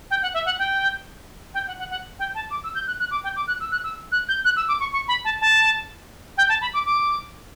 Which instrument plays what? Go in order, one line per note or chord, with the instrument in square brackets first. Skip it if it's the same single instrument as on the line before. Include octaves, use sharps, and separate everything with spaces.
[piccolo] G5
F#5
E5
F#5
G5
G5
F#5
F#5
F#5
G5
A5
D6
E6
G6
F#6
F#6
D6
G5
D6
F#6
E6
F#6
E6
F#6
G6
F#6
E6
D6
C#6
C#6
B5
A5
A5
G5
A5
B5
D6
D6